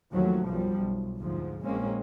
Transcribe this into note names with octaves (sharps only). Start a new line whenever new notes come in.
D#2 F3 F#3 A3
B1 F#2 F3 G3
B1
D2 G#2 F3
A#1 G#3 A#3 C4 C#4